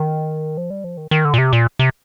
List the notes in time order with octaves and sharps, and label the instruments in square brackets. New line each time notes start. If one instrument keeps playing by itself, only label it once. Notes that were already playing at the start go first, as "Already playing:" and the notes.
Already playing: [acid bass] D#3
F3
G3
F3
D#3
D#3
D3
A#2
C3
A#2
C3